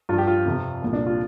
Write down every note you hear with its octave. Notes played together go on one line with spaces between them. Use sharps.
G2 F3 F4
G4
F4
F2 C3 F3
C2 A#2 F3
D4
F4